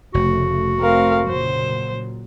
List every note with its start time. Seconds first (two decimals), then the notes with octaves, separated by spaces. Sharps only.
0.14 F1 C#3 A3 F#4
0.80 A3 C4 A#4 F5
1.29 A#2 C#3 F#3 C5